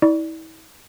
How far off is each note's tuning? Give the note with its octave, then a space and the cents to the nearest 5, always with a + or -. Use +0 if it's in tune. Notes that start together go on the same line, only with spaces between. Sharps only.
E4 -40 D5 +0 C#6 +30